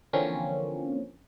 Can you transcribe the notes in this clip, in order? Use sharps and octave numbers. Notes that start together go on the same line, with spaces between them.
D3 E3 F3 A#3 C4 C#4